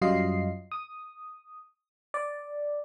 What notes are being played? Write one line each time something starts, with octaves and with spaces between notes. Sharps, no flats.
F#2 F#3 G3 F4 D#5 C7
D#6
D5